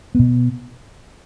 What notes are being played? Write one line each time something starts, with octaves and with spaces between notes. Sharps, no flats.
B2 B3